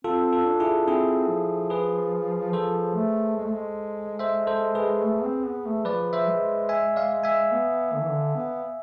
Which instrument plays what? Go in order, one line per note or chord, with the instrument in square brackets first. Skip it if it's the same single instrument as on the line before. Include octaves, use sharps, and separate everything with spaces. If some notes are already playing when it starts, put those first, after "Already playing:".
[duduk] C4 [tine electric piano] F4 A4
[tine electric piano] F4 A4
[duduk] D4
[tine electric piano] E4 G#4
[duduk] C4 [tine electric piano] E4 G#4
[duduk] F3
[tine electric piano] G#4 B4
[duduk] F3 [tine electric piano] A4 C5
[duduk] A3
G#3
A3
G#3
[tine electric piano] C5 E5
A4 C5
G#4 B4
[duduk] A3
C4
B3
A3
[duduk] F3 [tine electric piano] B4 D5
[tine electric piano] C5 E5
[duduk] G#3
[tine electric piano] E5 G#5
D5 F5
E5 G#5
[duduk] B3
D3
E3
D3
B3